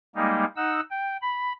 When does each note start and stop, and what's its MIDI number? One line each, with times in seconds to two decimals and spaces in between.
0.15 0.45 55
0.15 0.45 56
0.15 0.45 58
0.15 0.45 63
0.56 0.80 63
0.56 0.80 78
0.56 0.80 88
0.91 1.17 79
1.22 1.53 83